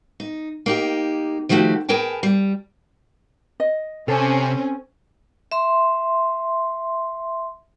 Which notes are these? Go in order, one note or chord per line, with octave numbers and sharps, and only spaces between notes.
D#4
A#3 D#4 G4
D#3 F3 A3 F#4 G4
G#4 A#4 B4 G5 A5
G3
D#5
C3 C4 C#4 A4
E5 C6